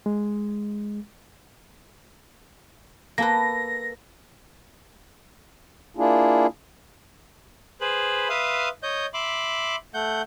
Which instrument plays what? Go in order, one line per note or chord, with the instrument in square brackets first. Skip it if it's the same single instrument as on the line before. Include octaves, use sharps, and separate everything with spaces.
[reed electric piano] G#3
[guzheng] A#3 A4 B4 [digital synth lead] A#6
[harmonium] A#3 D4 E4 F4 G#4
[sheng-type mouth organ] G#4 B4 C5 B5
B4 E5 F5 C6 D#6
C#5 D#5 G6
E5 B5 C6 D6
A3 F#5 G6